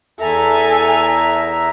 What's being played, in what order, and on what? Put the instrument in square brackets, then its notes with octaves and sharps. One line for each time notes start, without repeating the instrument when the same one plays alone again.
[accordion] E2 E5 A#5 [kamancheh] A4 G#5